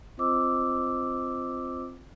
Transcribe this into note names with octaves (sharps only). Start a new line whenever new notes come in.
C4 F4 C5 D#5 D6 E6